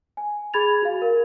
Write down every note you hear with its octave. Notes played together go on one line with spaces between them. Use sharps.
G#5
G#4 B5 G#6 A6 F7
F#4 F5
A#4